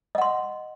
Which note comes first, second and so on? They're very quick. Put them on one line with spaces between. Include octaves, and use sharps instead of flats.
D#5 F#5 C6